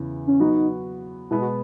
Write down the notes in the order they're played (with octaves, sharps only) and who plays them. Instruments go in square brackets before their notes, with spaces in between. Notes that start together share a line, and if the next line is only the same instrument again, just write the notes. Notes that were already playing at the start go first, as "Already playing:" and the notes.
Already playing: [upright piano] E2 C#3 E3
[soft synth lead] C#4
[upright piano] F#3 B3 F#4 [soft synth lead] D#4
[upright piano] B2 G#3 B3 [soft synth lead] E4
[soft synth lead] F#4